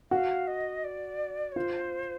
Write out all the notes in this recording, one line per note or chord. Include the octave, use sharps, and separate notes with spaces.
F#4 F5
D#5
D5
C#5
F4 C5